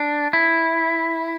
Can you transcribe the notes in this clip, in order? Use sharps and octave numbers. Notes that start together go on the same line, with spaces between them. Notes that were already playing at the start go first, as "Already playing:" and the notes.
Already playing: D4
E4